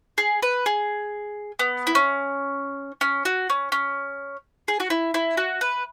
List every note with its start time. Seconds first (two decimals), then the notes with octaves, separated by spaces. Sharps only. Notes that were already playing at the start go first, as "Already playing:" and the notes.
0.18 G#4
0.42 B4
0.66 G#4
1.59 B3
1.87 E4
1.95 C#4
3.01 C#4
3.25 F#4
3.50 C#4
3.72 C#4
4.68 G#4
4.80 F#4
4.90 E4
5.14 E4
5.37 F#4
5.61 B4